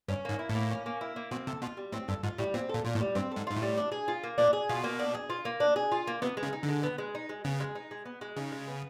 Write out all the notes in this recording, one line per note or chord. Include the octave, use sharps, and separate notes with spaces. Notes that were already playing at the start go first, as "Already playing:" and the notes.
G2 C#4
G#2 A#3
E4
A2
A#3
C#4
A#3
E4
A#3
B2 C4
C3 A4
B2 F4
G3
A2 C4
G2 A4
G#2 F4
A2 G3
A#2 C4
A#2 A4
A#2 F4
A2
G3
G2 C4
G#2 A4
G#2 F4
A2
G3
D4
G#4
F4
A#3
A#2 D4
G#4
B2 F4
A#3
D4
G#4
F4
A#3
D4
G#4
F4
A#3
C3 B3
G#3
C#3
D#4
D3
G#3
B3
G#3
D#4
G#3
C#3 B3
G#3
D#4
G#3
B3
G#3
C#3 D#4
G#3
B3